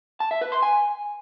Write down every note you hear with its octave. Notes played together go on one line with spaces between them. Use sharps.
A5
E5
B4
C6
G#5